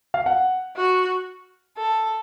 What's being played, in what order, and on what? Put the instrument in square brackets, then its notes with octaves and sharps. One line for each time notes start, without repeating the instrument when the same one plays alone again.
[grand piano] F5
F#5
[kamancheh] F#4
A4